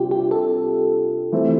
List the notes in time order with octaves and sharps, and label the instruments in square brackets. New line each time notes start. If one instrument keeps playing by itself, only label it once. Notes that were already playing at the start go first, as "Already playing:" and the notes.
Already playing: [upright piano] C3 G3 D4 [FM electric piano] F4 G4
[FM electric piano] G4
A4
[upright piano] E3 A3 C4